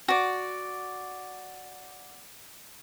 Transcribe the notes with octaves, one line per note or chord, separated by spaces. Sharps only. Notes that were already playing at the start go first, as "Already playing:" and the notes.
F#4 D5